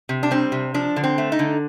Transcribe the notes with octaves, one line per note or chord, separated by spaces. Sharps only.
C3
D4
G3 C4
C3
F3 D4
D3
C4
A3
D#4
D3